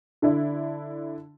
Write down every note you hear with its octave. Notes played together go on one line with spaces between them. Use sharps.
D3 D4 E4